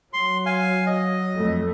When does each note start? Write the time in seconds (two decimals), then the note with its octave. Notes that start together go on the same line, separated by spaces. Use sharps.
0.13 F#3 C6
0.46 F5 G#5
0.87 D#5
1.36 F2 A3